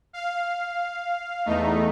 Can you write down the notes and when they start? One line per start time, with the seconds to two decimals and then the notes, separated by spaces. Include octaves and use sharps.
0.13 F5
1.46 E2 A3 D#4